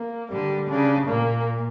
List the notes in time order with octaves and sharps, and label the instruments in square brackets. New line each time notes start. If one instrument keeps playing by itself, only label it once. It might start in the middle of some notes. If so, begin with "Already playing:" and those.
Already playing: [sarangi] A#3
[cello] D3 [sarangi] G3
[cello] C#3 [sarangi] D4
[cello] A#2 [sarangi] A#3